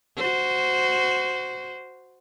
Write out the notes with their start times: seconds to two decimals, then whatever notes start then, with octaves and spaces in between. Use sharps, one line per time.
0.16 F#4 C5